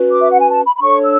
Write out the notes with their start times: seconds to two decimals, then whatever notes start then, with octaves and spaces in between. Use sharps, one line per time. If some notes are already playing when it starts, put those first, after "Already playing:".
Already playing: C#4 F#4 B4
0.11 D6
0.21 E5
0.30 F#5
0.39 G#5
0.50 A5
0.65 B5
0.76 B5
0.80 D4 A4 C#5 C#6
1.04 E6